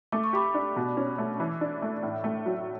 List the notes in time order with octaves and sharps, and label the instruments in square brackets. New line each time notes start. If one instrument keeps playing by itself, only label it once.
[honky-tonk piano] A3 [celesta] D6
[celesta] C#6
[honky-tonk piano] G4 [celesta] B5 D6
[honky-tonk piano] D4
B2
C#4
A3
E3
D4
A3
A2
A3
F#3